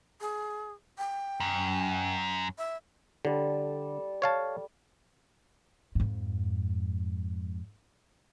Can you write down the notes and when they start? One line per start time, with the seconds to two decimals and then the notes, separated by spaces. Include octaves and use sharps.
0.21 G#4
0.98 G5
1.40 F#2
2.58 E5
3.25 D3 G3 A4
4.22 C#5 F5 A5
5.95 F2 G#2